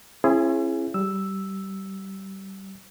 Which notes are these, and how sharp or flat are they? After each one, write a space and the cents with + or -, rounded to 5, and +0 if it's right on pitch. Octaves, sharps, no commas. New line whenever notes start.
C#4 -45 E4 +30 G#4 +0
G3 -20 E6 +0